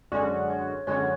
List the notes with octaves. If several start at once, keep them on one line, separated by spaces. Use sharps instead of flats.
F#2 D3 G#3 C#4 F#4 D5
C#5
F#2 D3 G#3 C#4 F#4 C#5